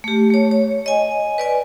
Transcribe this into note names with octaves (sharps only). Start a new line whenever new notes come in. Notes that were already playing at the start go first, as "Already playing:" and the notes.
A3 G4
A3 C#5
C#5
D#5 G#5
B4 D5 G#5